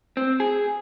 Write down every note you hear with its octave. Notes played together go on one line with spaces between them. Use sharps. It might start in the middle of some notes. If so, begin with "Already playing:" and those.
C4
G#4